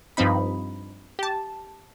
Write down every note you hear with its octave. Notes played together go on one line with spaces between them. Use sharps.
G2 F3 C4 D#4 B5
G4 A5